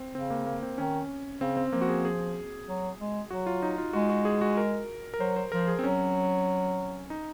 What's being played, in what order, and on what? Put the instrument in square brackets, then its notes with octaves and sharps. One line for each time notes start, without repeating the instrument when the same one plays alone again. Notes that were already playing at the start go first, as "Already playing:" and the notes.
Already playing: [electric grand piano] C4
[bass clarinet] C#3 [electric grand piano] C4
[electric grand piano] A#3
A#3
C4
[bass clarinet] D#3 [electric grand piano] C#4
[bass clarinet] C#3 [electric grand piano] C4
[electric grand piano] C4
[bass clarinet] F3 [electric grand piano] A#3
[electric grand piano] F#4
G#4
G#4
[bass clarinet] F#3
G#3
[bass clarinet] F#3 [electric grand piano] F#4
[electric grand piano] F4
D#4
F4
[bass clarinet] G#3 [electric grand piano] F#4
[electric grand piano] F#4
G#4
F#4
A#4
A#4
[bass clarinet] F#3 [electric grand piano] C5
[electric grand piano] C5
[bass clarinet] F3 [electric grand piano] A#4
[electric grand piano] G#4
C4
[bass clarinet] F#3 [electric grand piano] C#4
[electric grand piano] D#4